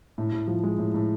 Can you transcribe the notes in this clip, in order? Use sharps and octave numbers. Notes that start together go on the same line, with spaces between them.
A2
A2
F3
G#3
A2
A2